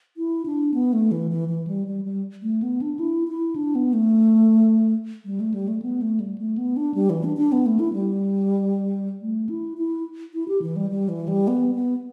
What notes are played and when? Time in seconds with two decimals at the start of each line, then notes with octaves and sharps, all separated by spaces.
0.17 E4
0.46 D4
0.74 B3
0.93 A3
1.12 E3
1.31 E3
1.49 E3
1.67 G3
1.87 G3
2.05 G3
2.43 A3
2.63 B3
2.81 D4
2.99 E4
3.28 E4
3.56 D4
3.75 B3
3.93 A3
5.25 G3
5.40 A3
5.54 G3
5.68 A3
5.82 B3
6.01 A3
6.20 G3
6.38 A3
6.58 B3
6.77 D4
6.94 G3
7.10 E3
7.24 D4
7.37 D4
7.52 B3
7.66 A3
7.79 E4
7.93 G3
9.22 A3
9.49 E4
9.78 E4
10.34 E4
10.48 G4
10.62 E3
10.76 G3
10.91 G3
11.09 E3
11.28 G3
11.48 B3
11.75 B3